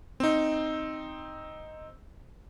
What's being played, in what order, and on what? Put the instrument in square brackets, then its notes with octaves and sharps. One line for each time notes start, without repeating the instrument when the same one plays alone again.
[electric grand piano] C4 D#4